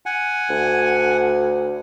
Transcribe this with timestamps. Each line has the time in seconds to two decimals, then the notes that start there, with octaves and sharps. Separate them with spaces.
0.06 F#5 G#5
0.49 D2